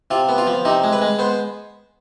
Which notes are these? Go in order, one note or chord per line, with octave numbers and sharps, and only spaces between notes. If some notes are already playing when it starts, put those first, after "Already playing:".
C3 F4
B3
F4
F3
C3 D#4
G#3
B4
G#3
B3 C5